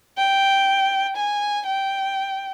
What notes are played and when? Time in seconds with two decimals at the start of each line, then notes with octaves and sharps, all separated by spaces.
0.18 G5
1.16 G#5
1.66 G5